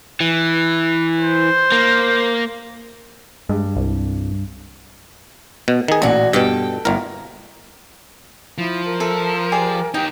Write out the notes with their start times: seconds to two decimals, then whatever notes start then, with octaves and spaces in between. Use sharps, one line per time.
0.21 E3
1.21 C5
1.72 A#3
3.49 G2 G#3
3.76 C2
5.68 B2
5.88 D#3 G#4
6.02 A1 A#2 F#4
6.33 G2 B2 A4 G5
6.85 G1 A2 A#4
8.58 F3 E4
8.85 A#4
9.00 A4 E5
9.52 G4 G#4 D5
9.94 D#4 G4 G5 D#6